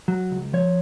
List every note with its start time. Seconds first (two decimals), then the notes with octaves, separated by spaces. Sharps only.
0.08 F#3
0.31 C#2
0.53 F3 C#5